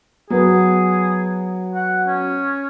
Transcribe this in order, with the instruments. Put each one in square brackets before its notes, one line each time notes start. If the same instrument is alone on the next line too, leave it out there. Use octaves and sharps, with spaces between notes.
[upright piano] F#3 B3 B4 [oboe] G#4
[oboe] F#5
C#4